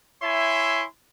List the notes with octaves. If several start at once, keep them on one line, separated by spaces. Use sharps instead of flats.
E4 C#5 E5 G#5 C6